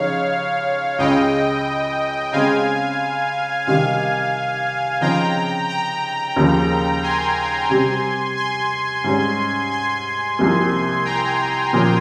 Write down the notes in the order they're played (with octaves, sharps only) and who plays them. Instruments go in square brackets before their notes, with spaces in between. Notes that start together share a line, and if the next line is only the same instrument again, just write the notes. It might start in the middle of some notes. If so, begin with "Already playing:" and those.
Already playing: [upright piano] C#3 F3 D#4 [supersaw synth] C#5 F5
[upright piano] C#2 C#3 G#3 [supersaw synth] D#5 G5
[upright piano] C#3 G#3 C4 [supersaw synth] F5 G#5
[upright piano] C3 D#3 G3 [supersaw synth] F5 G#5
[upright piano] C#3 F3 C4 D#4 [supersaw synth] G5 A#5
[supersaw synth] G5 A#5
[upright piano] D#2 C#3 F3 A#3
[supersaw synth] G#5 C6
[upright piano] C3 G3 C4
[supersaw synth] G#5 C6
[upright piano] G#2 G3 C#4
[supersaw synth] G#5 C6
[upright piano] C2 C3 F3 A#3
[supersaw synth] G5 A#5
[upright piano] A#2 F3 A#3 C#4